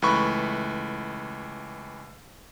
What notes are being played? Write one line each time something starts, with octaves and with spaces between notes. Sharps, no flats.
C#2 E3 A3 B4 B5 C#6